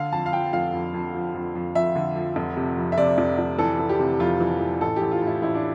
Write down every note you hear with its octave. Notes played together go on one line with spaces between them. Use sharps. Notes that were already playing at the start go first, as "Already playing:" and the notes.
Already playing: D3 F5
F2 A5
F5
F3 G5
F1 F5
F2
F2
F3
F2
F2
F2 E5
D3
F3
F1
C3
F2
E5
C3 D5
F1
F1
E3 A4
E3
G4
C3
F2 F4
E3
E3
A1 A4
A1 G4
F4
A2 E4
A1 E4
D4